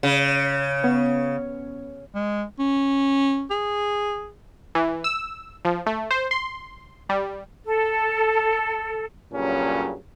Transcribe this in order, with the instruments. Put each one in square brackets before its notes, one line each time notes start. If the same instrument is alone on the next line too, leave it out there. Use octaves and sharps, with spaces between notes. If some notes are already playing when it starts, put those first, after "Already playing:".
[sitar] C#3
[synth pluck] B3 C#5
[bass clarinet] G#3
C#4
G#4
[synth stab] E3
E6
F3
A3
C5
C6
G3
[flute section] A4
[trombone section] G2 A#2 C#3 F#3 C#4